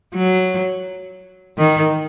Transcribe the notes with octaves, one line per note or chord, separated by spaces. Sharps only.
F#3
D#3